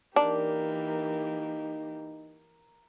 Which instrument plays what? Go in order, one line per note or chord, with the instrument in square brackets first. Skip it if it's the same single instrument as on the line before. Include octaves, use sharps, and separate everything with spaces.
[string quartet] E3 A#3 G4 [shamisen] D4 [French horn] D#4 [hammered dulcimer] A#4